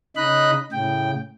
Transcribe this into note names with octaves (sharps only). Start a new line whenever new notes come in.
C#3 D#4 D#5 B5 F#6
A2 C#3 G5